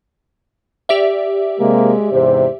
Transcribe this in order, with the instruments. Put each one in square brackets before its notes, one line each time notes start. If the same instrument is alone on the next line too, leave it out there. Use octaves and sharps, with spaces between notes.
[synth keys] G4 D5 E5
[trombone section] C3 A#3 [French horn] G#3
[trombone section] E2 G#2 C3 [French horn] C5